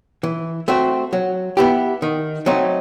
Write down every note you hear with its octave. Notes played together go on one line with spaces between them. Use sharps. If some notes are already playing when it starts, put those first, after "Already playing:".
E3
A3 C4 F#4
F#3
B3 E4 G4
D#3
F#3 A3 C4 D#4